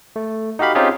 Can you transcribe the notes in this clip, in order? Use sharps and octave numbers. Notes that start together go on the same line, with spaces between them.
A3
D#4 F#4 G4 F5 B5
C4 C#4 D#4 F4 G4 G#4